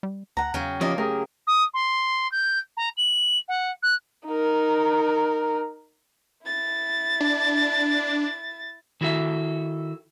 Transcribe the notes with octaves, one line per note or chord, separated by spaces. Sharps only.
G3
D2 F#5 A#5
E2 C#3 F#3 G5
F3 A#3 C#4 G4 D5 D#5
A3 G4 G#4 A#4
D#6
C6
G6
A#5
F#7
F#5
F#6
D#4 A#4
E4 A6
D4
D#3 E4 F#4 A4 E5